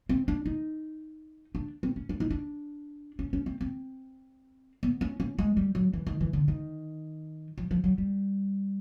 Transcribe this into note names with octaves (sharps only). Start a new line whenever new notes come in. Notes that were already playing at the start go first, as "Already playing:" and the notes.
C4
D4
D#4
D4
C4
C#4
D4
D#4
D4
C#4
C#4
C4
C4
B3
C#4
C#4
G#3
G3
F#3
E3
D#3
E3
D3
D#3
F3
F3
F#3
G3